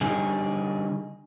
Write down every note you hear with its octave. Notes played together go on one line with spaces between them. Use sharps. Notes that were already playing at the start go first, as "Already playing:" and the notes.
D3 G3 D#4 G#4